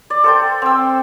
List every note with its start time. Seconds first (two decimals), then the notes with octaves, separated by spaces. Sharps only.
0.10 D5
0.24 A4 C5 G5
0.62 C4 E6